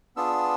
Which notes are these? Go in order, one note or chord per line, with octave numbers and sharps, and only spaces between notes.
B3 D4 F4 G#4 E6